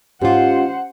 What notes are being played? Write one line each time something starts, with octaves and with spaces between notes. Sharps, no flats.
G#2 C#4 F4 G4 C5 F#5